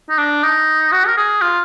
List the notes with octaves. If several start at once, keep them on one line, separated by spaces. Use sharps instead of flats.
D#4
D4
D#4
F#4
A#4
G#4
F4